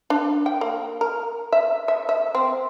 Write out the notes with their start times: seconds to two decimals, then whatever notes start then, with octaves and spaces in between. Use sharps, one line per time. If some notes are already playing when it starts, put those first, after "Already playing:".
0.10 D4
0.46 G5
0.61 A#3
1.01 A#4
1.52 E5
1.88 E5
2.09 E5
2.35 C4